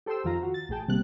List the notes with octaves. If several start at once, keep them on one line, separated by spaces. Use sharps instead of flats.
G4 A4 C5 G5 C6 E6
F2 D#3 F4 A#5
F#4
A6
A1 A2 G#4 G5 A5
C3 D#3 G3 A#3 F#6